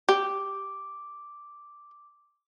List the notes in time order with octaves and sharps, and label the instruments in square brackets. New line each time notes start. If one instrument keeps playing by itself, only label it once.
[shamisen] G4 [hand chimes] D6